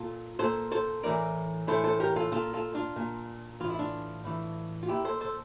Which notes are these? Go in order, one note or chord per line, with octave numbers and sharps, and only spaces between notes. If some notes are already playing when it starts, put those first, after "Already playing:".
Already playing: A#2 F4 A4
A#2 A4 C5
A4 C5
A2 E3 A#4 D5
A2 E3 A4 C5
A4 C5
G4 A#4
F4 A4
A#2 F4 A4
F4 A4
D4 F4
A#2
A2 E3 F4
E4
D4 F4
A2 E3
F4
A#2 E4 G4
A4 C5
A4 C5